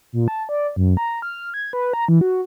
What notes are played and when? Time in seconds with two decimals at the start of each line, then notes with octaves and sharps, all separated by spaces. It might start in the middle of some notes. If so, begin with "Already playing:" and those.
0.13 A#2
0.28 A5
0.49 D5
0.76 F#2
0.97 A#5
1.22 F6
1.54 G#6
1.73 B4
1.93 A#5
2.08 E3
2.21 F#4